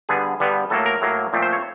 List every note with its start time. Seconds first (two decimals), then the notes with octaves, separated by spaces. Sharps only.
0.09 G2 D3 G3 B3 G#4
0.40 G2 D3 G3 B3
0.70 A2 F#3 A#3 A4
0.86 A#4
1.02 A2 F#3 A#3
1.33 A#2 F3 A3 C4
1.42 C5
1.53 C#5